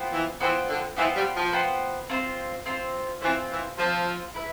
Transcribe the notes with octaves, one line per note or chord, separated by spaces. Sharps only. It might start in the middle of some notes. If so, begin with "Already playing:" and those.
Already playing: B3 F4 C5 G5
E3
E3 B3 F4 C5 G5
D3
E3 B3 F4 C5 G5
G3
F3
B3 F4 C5 G5
C4 F4 C5
C4 F4 C5
E3 C4 F4 C5
E3
F3 C4 F4 C5
E4 B4 E5